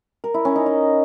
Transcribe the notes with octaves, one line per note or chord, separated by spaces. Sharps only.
A#4
E4
C#4
D#4
D#5